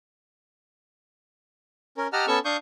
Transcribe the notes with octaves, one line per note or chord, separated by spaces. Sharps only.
C#4 A#4
G4 D#5 F#5 A5 A#5 F6
B3 C#4 A4 A5 C#6 E6
D4 F5 C#6 D#6 G6